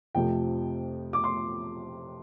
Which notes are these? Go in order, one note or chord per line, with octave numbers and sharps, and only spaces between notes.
F2 C3 F3 A3 G5
D6
C6